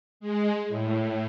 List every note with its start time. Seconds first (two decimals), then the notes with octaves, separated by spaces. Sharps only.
0.20 G#3
0.68 A2